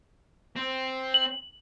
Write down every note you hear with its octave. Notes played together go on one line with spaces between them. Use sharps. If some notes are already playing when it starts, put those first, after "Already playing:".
C4
F#7